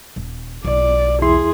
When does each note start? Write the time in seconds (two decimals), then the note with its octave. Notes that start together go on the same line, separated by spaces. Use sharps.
0.16 D#1
0.65 B1 D5
1.22 E2 E4 G#4 C6